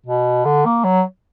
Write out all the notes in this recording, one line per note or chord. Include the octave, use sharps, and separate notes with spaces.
B2
D3
A#3
F#3